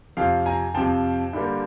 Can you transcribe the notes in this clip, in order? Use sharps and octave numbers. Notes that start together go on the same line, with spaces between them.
F2 C3 F3 F5 G5
G#5 A#5
F2 C3 F3 G5 A5
G2 D3 G3 A#3